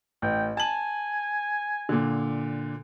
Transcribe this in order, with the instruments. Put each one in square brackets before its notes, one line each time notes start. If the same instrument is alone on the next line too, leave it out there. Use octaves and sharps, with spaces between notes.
[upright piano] A1 [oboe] G5
[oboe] G#5 [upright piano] A5 F#7
[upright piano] A#2 D3